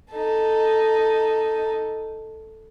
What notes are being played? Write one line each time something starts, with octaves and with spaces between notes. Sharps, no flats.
D#4 A4